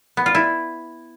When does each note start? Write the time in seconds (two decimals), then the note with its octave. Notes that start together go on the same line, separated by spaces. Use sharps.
0.17 B3
0.26 F4
0.35 E4